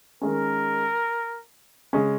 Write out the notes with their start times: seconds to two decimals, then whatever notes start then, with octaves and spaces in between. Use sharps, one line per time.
0.22 D#3 G#3 C#4 A#4
1.93 C#3 G#3 C#4